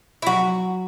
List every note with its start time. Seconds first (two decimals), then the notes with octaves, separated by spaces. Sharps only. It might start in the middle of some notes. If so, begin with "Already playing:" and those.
0.22 E4
0.26 F#3 F#4